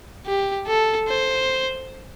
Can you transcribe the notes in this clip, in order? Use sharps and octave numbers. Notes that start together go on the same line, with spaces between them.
G4
A4
C5